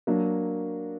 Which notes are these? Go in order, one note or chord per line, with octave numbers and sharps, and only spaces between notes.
F#3 A#3 D4